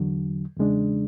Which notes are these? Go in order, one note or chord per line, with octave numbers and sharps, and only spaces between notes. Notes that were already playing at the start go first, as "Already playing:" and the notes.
Already playing: E2 D3 F#3
E2 C#3 G#3 D4